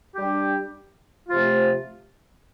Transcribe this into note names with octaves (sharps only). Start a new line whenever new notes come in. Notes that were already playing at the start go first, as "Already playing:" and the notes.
G3 D4 G4
C3 F3 A3 F4